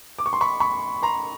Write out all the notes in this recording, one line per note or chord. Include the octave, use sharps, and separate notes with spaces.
D6
C#6
C6
B5 C#6
B5 C#6
A#5 C6